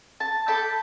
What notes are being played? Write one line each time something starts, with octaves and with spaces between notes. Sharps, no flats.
A5
A4 G5 A5 B5